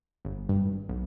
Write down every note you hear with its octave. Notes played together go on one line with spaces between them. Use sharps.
G1
G2
G#1
B1